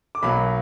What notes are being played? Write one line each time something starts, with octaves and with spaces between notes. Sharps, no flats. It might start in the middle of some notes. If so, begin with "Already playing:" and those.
D6
B1 B2 F#3 A#3 B5